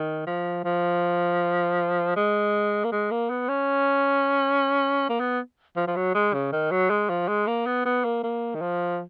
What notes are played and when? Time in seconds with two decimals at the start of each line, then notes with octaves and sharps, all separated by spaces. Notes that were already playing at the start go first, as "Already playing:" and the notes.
Already playing: D#3
0.27 F3
0.65 F3
2.16 G#3
2.85 A#3
2.92 G#3
3.11 A#3
3.30 B3
3.49 C#4
5.10 A#3
5.20 B3
5.77 F3
5.87 F3
5.96 F#3
6.14 G#3
6.34 C#3
6.53 D#3
6.71 F#3
6.90 G#3
7.09 F3
7.28 G#3
7.47 A#3
7.66 B3
7.85 B3
8.04 A#3
8.23 A#3
8.55 D#3
8.61 F3